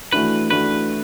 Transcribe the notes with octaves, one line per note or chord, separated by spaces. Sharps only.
E3 A3 D4 F#4 B4
E3 A3 D4 F#4 B4